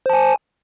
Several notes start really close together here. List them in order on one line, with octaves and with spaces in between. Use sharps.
C5 A5 G#5